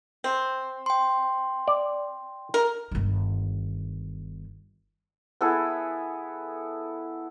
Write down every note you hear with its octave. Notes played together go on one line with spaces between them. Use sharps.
C4
G5 C6
D5
A#4
G1 D#3
B3 E4 G#4 A4